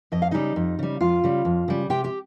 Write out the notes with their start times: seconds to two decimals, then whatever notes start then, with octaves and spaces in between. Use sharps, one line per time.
0.12 F2 D#5
0.22 F5
0.31 C#3 G3 D#4 D#5
0.56 F2
0.79 C#3 G3
1.01 F2 F4 F5
1.24 C#3 G3
1.45 F2
1.68 C#3 G3
1.90 C3 G4 G5
2.04 G4 G5